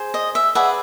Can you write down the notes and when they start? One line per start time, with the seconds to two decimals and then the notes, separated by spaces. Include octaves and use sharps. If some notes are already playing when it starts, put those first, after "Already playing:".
Already playing: G#4 C5
0.14 D#5
0.35 E5
0.55 G#4 B4 D5 E5 F#5